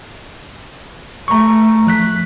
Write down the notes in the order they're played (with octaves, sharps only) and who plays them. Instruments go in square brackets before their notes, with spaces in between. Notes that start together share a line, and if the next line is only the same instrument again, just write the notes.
[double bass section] A3 [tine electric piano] A#5 C#6
[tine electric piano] F3 F#6 B6